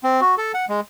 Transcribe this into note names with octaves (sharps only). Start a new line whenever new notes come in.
C4
F#4
A4
F#5
G#3